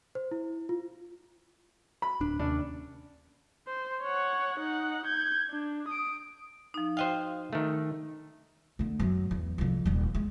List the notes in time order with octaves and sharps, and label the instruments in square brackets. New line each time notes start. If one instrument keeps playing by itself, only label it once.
[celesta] C5
E4
F4
[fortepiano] B5
[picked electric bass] D1 D4
[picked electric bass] D#2 C3 C#4 [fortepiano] D4
[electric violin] C5
C#5 F#5
D#4 F#5
G6 G#6
D4
D#6 D7
[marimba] F3 D#4
[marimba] F#4 G5 [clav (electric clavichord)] C5 D#5 F5
[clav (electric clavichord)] D#3 A3
[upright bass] D3 A3
F#2
E2
C2 F2
D#1 G3
G#3